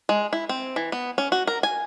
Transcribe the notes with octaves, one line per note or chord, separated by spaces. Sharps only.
G#3
E4
C4
E3
B3
C#4
F#4
A#4
G#5